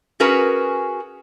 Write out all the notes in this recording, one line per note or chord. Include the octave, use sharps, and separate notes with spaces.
C#4 F#4 G#4 A#4 B4